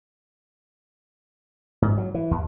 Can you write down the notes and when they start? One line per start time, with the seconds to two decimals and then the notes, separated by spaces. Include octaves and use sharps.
1.82 G#2
1.98 F#3
2.14 E3
2.31 D#2